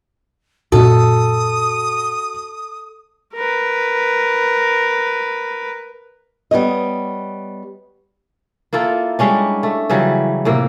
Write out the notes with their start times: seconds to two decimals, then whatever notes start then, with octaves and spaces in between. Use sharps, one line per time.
0.72 F#2 A#2 C#4 F#4 A4 D#6
3.34 A#4 B4
6.51 G3 B3 C#5 D#5
8.73 A#3 E4 F4 A4
9.19 G3 G#3 C#4 D4
9.63 A3
9.89 C#3 E3 F#3 G3
10.45 A2 C3 A#3